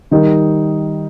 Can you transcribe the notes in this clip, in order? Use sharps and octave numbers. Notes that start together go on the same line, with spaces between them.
D#3 G3 D#4 A#4